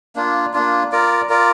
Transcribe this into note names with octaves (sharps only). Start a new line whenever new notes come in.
A#3 D4 F4
A#3 D4 F4
F4 A#4 D5
F4 A#4 D5